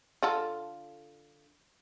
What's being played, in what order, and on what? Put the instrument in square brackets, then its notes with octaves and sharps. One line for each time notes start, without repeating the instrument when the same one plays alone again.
[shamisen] D3 F4 A4